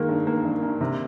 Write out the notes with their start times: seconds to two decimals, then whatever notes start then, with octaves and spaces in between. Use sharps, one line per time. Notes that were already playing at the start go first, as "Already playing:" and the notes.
Already playing: D#3 G#3 A#3
0.09 G2
0.27 A#3
0.45 G2
0.63 G2
0.81 C3